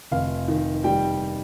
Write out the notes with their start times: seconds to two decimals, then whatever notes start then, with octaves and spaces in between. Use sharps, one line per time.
0.12 F1 F5
0.48 D#3
0.84 G3 G5